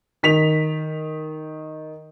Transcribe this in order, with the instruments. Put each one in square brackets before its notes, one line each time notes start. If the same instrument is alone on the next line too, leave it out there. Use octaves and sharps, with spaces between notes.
[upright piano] D#3 B6 F7